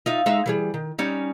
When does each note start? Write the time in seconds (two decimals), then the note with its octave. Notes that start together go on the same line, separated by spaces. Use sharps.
0.06 D#4 F4 E5
0.26 G#3 D#4 E5
0.46 E3 G3 G#4
0.74 D#3
0.98 G3 C#4 D#4